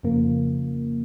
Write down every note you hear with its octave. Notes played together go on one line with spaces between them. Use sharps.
F2 C#3 F3 A#3